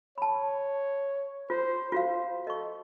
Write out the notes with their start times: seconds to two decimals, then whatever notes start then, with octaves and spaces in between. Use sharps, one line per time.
0.18 C#5 A5 B5
1.50 F4 C5
1.92 F4 F#4 C5 F5
2.47 A4 D#5 C#6